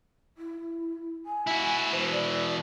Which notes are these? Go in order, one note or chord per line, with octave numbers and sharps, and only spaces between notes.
E4
G#5
E4 F#4
B2 E3 C5
D5